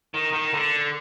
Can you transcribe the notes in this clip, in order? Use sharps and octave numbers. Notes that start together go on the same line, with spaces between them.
D#3
D#3
D3